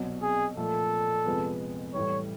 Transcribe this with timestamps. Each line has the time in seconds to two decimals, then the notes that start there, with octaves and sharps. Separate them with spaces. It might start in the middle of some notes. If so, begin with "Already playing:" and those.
Already playing: C2 B2 F#3
0.22 G#4
0.57 A#2 F3 A3 A4
1.25 F2 C3 F3 G#3 B3
1.94 A2 E3 G3 C#5